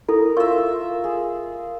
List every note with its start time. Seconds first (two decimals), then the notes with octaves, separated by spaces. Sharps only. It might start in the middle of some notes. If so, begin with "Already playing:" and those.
0.09 E4 A4 A#4
0.37 F4 A#4 E5 C#6
1.04 G#4